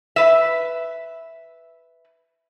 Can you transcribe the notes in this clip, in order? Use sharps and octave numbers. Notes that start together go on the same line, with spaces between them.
B4 E5